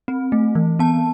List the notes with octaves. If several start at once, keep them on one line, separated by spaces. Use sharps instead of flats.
C4
A3
E3
B3 A5